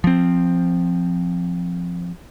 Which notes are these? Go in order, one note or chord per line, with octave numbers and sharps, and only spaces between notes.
F3 C4